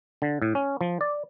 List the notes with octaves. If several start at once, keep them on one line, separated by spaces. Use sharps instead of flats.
D3
A2
C#4
F3
D5